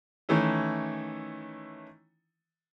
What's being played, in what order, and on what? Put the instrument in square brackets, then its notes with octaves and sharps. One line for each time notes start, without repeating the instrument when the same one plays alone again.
[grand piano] D#3 E3 A3 C#4 E4